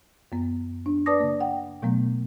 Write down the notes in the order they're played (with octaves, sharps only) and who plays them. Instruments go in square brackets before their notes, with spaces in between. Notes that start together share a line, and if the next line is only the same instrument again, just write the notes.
[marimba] F#2 B3
D4
B4 D5 A5 D6 D#6 A#6
C#3 A#3
F#5 G5
B2 F#3 A3 B3